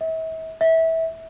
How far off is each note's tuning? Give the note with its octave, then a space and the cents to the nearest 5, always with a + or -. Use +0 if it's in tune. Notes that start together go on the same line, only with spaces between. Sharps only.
E5 -40
E5 -20